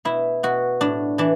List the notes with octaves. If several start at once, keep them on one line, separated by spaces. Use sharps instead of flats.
B2 E4
B2 F#4
A2 D4
E3 D4